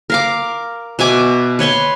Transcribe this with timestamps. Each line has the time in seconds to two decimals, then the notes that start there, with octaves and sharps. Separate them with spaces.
0.10 A#4 F5 D6
0.99 B2 E5 G#5 D6
1.59 B4 C#5 C6 C#6